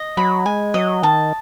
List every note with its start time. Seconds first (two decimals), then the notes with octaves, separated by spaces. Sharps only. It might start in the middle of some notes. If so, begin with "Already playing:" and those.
Already playing: D#5
0.17 F#3 B5
0.46 G#3 G#5
0.74 F#3 D#5
1.03 D#3 A5